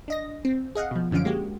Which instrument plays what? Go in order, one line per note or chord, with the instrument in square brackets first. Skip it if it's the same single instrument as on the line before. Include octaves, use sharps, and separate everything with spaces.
[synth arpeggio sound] D4 D#5 A#6
C4
G#4 D#5 F5 F#5
B2 F3
F#2 D3 F3 C#4 F5 D7
G#3 A#3 F#4 G4